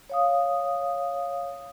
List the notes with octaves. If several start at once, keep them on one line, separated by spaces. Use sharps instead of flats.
C#5 F5 D#6